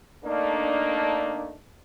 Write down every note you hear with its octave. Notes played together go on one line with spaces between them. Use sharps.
A3 A#3 D4 D#4